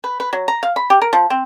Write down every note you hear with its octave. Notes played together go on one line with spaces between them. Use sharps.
B4
B4
F#3
A#5
F5
B5
G4
A#4
F3
C4